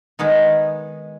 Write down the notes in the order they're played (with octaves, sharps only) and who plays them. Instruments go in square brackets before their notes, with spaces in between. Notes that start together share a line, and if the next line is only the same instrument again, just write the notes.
[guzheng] D#3 G#3 B3 D#4